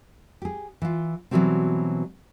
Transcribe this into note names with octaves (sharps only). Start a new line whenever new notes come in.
G4 G#4
E3 F4
B2 D#3 E3 F#3 G3 C4